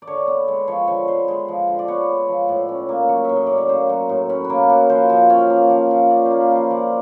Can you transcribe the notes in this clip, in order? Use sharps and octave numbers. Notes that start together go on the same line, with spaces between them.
D5
D3 C#5
B3
G#3
F3 C#5
D3 C#5
B3 C5
G#3 C5
F3
D3
D5
B3 C#5
G#3
F3
A2 D5
C#4
A#3
F#3 C#5
A2 E5
D#5
C#4 D5
C#5
A#3 C5
F#3
A2
C#4 B4
B4
A#3 A#4
F#3 B4
F3 C5
F3
C#4
A#3
F3
F3
C#4 D5
C5
A#3
B4
F3 C5
F3 D5